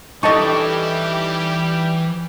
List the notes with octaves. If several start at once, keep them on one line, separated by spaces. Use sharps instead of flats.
E3 G3 D#4 G4 A4 D#5 A5 C#6